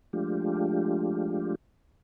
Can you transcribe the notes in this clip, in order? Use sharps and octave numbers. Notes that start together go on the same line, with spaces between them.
F3 G#3 A3 D4 F4 G4